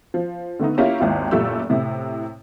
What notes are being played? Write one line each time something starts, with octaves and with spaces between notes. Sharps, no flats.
F3
D3 A3 B3 D#4
A#3 C#4 E4 F4 G4 A#4
G#1 D#2 E4 F4
F#1 A#2 A3 F4 G4 E6
A2 C3 E4